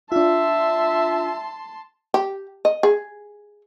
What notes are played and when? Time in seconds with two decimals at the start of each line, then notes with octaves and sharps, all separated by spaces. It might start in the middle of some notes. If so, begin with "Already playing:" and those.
0.12 D4 F4 E5 A5 C6
2.14 G4
2.65 D#5
2.83 G#4